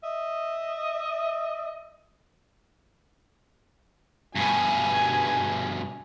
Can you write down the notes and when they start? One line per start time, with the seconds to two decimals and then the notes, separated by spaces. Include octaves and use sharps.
0.03 D#5 E5
4.35 G2 B2 G#5